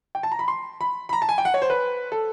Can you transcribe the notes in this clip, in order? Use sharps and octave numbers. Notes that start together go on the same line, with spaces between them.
G5
A5
A#5
B5
C6
B5
B5
A#5
A5
G#5
G5
F#5
C#5
C5
B4
A4